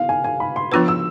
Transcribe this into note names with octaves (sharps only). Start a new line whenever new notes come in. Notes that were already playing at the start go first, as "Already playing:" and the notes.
Already playing: B3 E4 F5
G#5
G#5
B5
C6
F3 B3 D4 F4 B4 E6
E6